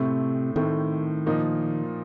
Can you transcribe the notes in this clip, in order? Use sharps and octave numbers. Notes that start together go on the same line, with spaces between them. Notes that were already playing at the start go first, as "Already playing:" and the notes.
Already playing: A2 C3 A3 C4
A2 D#3 A3 C4
A#2 F3 A#3 D#4